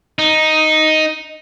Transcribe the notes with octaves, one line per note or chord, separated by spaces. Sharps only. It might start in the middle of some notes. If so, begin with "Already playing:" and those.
D#4